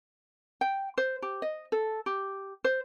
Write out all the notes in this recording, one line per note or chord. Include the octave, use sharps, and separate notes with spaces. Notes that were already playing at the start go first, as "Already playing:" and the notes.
G5
C5
G4
D#5
A4
G4
C5